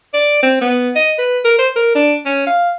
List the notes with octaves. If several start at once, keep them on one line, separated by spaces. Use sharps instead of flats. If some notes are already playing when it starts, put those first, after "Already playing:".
D5
C4
B3
D#5
B4
A#4
C5
A#4
D4
C#4
F5